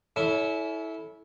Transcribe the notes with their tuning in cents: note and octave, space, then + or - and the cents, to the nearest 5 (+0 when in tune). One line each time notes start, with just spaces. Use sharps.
C#4 +30 E4 -15 A4 -15